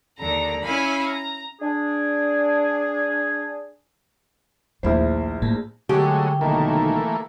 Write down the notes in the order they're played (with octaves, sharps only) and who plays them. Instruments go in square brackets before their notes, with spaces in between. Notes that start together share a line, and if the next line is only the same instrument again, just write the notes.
[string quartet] D#2 D3 A#5
C#4 E4 F5 G#5 B5
A#5
[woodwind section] D4 G#4
[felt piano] A#1 E4 C5 [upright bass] D#2 A3
[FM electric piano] A2 A#3 [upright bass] D#4
[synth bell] D3 C#6 [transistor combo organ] F#3 G#3 A3 [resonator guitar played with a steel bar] G4
[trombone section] B1 D#3 [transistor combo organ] E3 A3 A#3